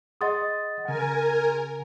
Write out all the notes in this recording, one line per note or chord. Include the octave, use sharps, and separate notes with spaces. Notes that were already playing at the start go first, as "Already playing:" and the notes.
G#4 D#5 F#5 C6 D#6 A6
C#3 A#4 F#5 G#5